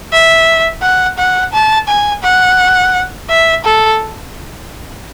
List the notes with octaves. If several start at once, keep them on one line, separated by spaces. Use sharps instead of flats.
E5
F#5
F#5
A5
G#5
F#5
E5
A4